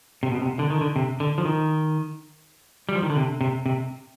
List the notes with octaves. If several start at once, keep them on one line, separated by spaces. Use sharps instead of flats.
C3
B2
C3
D3
D#3
D3
C3
D3
F3
D#3
G3
F3
D#3
D3
C3
C3
C3